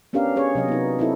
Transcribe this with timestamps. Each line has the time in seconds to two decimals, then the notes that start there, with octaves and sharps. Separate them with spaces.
0.13 B3 C#4 D4 G4 A#4 F5
0.36 C#4 G#4 C#5
0.55 C3 F#3 D#5
0.68 B3 D#4
0.99 C4 D#4 E4 A4